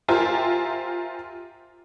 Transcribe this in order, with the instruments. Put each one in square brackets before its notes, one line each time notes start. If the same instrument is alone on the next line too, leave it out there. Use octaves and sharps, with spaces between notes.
[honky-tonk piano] F4 G4 A#4 C5 E5 G#5